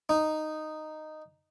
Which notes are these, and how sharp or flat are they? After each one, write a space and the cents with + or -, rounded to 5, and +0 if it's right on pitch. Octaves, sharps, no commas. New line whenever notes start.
D#4 -5